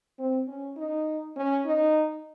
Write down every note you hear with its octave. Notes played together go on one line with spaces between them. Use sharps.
C4
C#4
D#4
C#4
D#4